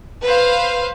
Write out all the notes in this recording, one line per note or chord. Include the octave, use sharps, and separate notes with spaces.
B4 C5 F5